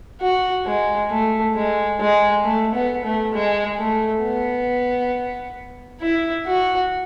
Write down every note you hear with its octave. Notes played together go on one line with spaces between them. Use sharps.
F#4
G#3
A3
G#3
G#3
A3
B3
A3
G#3
A3
B3
E4
F#4